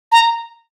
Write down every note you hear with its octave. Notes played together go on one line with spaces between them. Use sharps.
A#5